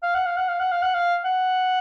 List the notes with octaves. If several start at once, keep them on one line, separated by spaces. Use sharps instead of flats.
F5
F#5
F5
F#5
F5
F#5
F5
F#5
F5
F#5